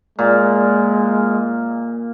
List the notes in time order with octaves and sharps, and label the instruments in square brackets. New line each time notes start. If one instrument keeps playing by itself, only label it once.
[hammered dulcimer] A#2 [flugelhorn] G#3